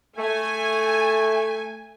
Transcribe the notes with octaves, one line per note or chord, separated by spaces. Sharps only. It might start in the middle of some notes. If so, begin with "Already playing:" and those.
A3 G#5